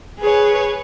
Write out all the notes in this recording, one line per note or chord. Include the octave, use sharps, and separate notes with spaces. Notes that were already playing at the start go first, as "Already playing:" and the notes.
G#4 B4 C#5